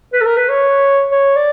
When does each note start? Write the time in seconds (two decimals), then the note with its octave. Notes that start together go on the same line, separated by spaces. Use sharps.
0.13 B4
0.21 A4
0.26 A#4
0.37 B4
0.49 C#5
1.12 C#5
1.36 D5